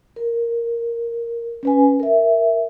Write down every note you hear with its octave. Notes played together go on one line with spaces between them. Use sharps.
A#4
C#4 B4 G#5
A#4 E5